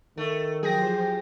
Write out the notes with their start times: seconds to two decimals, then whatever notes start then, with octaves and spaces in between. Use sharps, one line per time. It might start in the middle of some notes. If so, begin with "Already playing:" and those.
0.17 D#3 A3
0.63 F3 F#3 G4 G#4 C5 G5 A#6